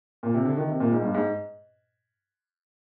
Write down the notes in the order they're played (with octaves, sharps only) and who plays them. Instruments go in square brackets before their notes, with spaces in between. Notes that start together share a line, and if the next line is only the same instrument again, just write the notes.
[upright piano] A#2
C3
D3
D#3
C3
A#2
G#2
G2
G#2